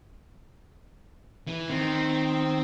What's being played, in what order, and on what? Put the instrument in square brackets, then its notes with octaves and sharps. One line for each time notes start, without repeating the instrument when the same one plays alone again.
[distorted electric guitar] E3
[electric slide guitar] D#3 [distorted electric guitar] C4